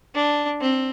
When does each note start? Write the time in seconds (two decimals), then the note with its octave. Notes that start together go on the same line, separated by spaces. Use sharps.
0.15 D4
0.61 C4